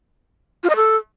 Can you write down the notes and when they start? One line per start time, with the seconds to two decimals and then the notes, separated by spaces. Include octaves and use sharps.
0.63 F4
0.70 D#5
0.76 A4